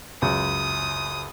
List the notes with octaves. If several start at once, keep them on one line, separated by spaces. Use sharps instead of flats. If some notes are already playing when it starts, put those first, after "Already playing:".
C#2 F#2 D#6